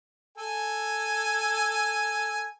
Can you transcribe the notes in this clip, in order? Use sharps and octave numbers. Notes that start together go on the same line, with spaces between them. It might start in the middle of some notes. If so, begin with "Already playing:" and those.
A4 G#5